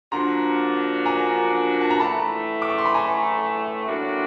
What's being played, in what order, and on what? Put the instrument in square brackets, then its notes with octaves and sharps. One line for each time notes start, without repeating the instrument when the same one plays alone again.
[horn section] D3 F3 A#3 D4 F#4 [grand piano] A#5 C6
[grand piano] G#5 A#5
A5
A#5
[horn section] A2 E3 A3 [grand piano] A5 B5
[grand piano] D6
C#6
C6
B5
G#5 A#5
[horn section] A2 F#3 A#3 D4 F#4